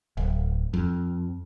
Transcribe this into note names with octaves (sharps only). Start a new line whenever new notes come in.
D1
F2